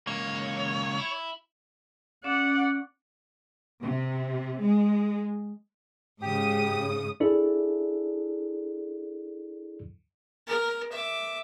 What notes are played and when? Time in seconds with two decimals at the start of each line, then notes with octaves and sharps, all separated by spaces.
0.07 C#2 A#3 C#5
0.99 E4
2.24 C#4 D5 F#5
3.82 C3
4.60 G#3
6.22 G#2 C#3 G4 D#6
7.20 D4 E4 G#4 A4 D5
10.47 A#4
10.92 E5 D6